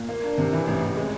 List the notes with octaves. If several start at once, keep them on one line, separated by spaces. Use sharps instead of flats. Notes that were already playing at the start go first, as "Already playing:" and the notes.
Already playing: A#2
A#3
D4
C3
E3
A1
A1
G#3